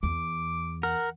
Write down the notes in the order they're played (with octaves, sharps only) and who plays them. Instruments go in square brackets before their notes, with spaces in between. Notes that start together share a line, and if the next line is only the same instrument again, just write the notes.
[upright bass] E2 [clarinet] D6
[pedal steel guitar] A#4 [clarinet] F#5